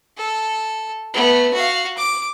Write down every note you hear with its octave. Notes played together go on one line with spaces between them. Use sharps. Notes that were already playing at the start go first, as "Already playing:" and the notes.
A4
A3 B3
F#4 F5
D6